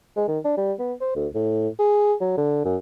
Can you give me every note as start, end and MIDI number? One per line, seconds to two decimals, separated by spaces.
0.17 0.24 56
0.28 0.39 51
0.45 0.54 62
0.58 0.73 55
0.79 0.93 59
1.01 1.13 72
1.16 1.27 38
1.35 1.69 45
1.79 2.14 68
2.21 2.33 54
2.37 2.60 50
2.65 2.77 42